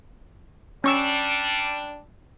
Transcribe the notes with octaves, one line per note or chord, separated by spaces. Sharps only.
G3 C#4 D4 C#6 E6